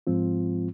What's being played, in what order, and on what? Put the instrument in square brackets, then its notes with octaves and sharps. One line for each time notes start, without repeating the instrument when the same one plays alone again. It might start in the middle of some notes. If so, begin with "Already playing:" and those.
[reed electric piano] G#2 F3 G#3 C4 F4